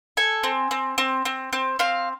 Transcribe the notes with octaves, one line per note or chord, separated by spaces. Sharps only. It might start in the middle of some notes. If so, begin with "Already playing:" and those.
A4 G#5
C4
C4
C4
C4
C4
C4 F5